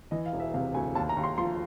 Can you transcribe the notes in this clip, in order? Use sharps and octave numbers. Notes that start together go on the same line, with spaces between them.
E3 D#5
F5
E1
E5
C3 F5
D2 G#5
D#2 A5
A#5
D#2
C6
F3 C6